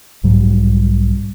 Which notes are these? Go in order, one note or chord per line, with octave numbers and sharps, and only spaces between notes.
B1 G#2 F#3 G3